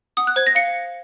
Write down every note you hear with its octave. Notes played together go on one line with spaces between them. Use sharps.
F#5 D#6
F#6
C5 G#6
A#6
F5 C#7